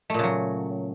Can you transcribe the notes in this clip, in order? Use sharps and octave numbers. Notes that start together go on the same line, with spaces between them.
A#2 C#3 F#3 A3